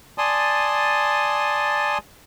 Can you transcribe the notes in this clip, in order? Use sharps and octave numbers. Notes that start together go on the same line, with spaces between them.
D5 G#5 A5 C6 D#6